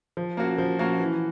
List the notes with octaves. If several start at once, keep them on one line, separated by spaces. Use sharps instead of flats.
F3
A#3 C#4 F#4
F3
A#3 C#4 F#4
E3